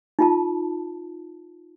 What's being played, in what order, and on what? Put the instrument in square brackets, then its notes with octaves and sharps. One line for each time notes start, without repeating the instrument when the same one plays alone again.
[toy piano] D#4 F4 A5